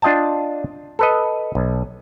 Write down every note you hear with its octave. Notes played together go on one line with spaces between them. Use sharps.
D4 F4 D#5 G5 A5
A4 B4 D#5
B1